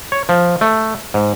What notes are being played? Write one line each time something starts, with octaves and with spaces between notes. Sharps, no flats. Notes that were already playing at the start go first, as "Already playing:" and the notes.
C#5
F3
A3
G#2